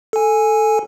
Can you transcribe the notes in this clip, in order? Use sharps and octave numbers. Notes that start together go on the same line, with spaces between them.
A4 G#5